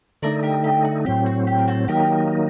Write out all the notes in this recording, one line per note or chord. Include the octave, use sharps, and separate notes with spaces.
D3 A3 D#4 A#4 D5
G4 A#4
G4
F#4
A2 F#3 C4 G4
F#4
G4
A#4
F#4 A4
D#3 F#3 A#3 D#4 G4 A#4